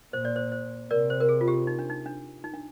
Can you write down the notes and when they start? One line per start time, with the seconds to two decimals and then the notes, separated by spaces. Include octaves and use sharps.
0.13 A#2 C5
0.25 D5
0.36 C5
0.52 C5
0.90 C3 A#4 D5
1.10 C5
1.20 A#4
1.29 G#4
1.41 F4
1.48 G4
1.67 D#4
1.79 D4
1.90 D#4
2.06 D4
2.44 D#4
2.53 D4